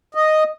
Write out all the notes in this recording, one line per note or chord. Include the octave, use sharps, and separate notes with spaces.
D#5